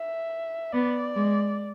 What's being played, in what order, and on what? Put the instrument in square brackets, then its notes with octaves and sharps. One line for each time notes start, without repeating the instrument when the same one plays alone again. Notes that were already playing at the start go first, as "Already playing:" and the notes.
Already playing: [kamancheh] E5
[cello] B3 [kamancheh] D5
[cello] G#3